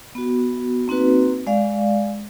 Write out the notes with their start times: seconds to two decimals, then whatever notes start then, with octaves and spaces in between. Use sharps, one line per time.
0.15 B3 F#4
0.88 A#3 C4 D#4 F#4 B4
1.47 G#3 D5 F5